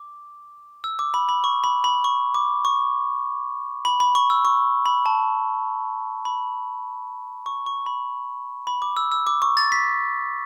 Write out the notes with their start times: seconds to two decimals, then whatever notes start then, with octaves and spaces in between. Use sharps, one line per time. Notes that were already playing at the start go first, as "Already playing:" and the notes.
Already playing: D6
0.84 E6
0.99 D6
1.14 B5
1.29 B5
1.44 C#6
1.64 B5
1.84 B5
2.04 C#6
2.34 D6
2.65 C#6
3.85 B5
4.00 B5
4.15 C#6
4.30 E6
4.45 C#6
4.86 B5
5.06 A5
6.25 B5
7.46 C#6
7.66 C#6
7.86 B5
8.67 B5
8.82 D6
8.97 E6
9.12 E6
9.27 D6
9.42 C#6
9.57 A6
9.72 B6